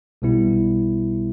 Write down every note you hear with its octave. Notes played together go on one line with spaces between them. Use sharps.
B1 B2 G3 B3 E4